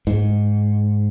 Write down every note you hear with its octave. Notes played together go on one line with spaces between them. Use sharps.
G#2